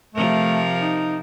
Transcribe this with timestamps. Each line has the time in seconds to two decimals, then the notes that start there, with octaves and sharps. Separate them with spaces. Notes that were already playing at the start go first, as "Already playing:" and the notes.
0.15 C3 F3 A3 A#4
0.80 D#4